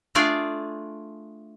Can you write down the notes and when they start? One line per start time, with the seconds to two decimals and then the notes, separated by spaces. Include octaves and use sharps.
0.15 A3 D4 F4 G#4 D5 G#5